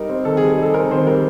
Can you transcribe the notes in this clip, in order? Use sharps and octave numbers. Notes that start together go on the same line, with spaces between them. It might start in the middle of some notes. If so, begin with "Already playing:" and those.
Already playing: G3 D#4 A#4
C4
D#3 A4
G#4
G3
G#4
D#4 A4
C4 A#4
D#3 C5
G3 A#4